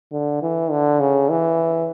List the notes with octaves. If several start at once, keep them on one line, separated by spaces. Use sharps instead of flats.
D3
E3
D3
C#3
E3